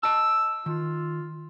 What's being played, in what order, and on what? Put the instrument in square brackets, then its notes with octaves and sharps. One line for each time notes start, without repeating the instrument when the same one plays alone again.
[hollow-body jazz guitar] D#5 A5 [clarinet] E6
[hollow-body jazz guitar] D#3 [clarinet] F4